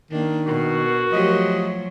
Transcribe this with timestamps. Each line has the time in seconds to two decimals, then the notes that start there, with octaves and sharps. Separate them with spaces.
0.12 D#3 A#3 D4
0.47 B2 F#4 A#4
1.12 F3 F#3 A3 G4 D#5